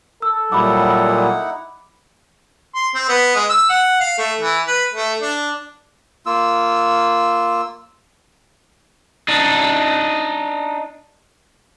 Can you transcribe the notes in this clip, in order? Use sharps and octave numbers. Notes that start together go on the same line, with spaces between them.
A4 E6
A#2 F#3 G3 D#4 E4 F#5 B5 D6
C6
C4
B3
G#3
E6
F#5
F5
A3
E3
B4
A3
D4
A#3 F4 E6
D4 D#4